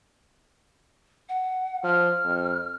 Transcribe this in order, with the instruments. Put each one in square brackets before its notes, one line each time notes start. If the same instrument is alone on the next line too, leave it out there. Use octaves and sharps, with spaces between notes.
[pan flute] F#5
[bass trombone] F3 [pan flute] F6
[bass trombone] F2